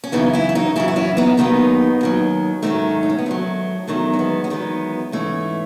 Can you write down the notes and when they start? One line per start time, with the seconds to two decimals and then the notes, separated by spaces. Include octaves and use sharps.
0.04 C#4
0.12 F#2 C#3 E3 B3 D#4
0.33 C#4 E4
0.49 E4
0.55 D#4 F#4
0.76 F#2 C#3 E3 C#4 E4
0.88 F#4
0.96 C#4 E4
1.17 B3 D#4
1.37 D#2 D#3 F#3 B3 D#4
2.01 D#2 D#3 F#3
2.63 G#2 D#3 F#3 A3 C#4
3.03 D#4
3.09 C#4
3.18 B3
3.26 G#2 D#3 F#3 A3
3.87 E2 D#3 F#3 A3
4.13 C#4
4.19 G#3 B3
4.44 C#4
4.50 E2 D#3 F#3 G#3 B3
5.12 G#2 E3 A3 C#4